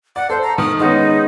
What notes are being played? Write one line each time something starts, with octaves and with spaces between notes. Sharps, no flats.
D5 F#5
A4 C5
A#5
D#3 D#6
G#3 B3 C#4 D#4